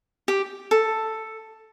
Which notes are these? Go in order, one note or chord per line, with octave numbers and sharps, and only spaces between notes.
G4
A4